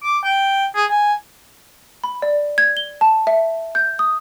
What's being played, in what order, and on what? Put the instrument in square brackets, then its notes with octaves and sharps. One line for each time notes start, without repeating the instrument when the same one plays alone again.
[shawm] D6
G5
G#4
G#5
[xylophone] B5
D5
G#6
G7
A5
E5
G6
D#6